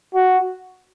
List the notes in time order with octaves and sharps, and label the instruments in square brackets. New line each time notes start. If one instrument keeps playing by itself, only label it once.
[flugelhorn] F#4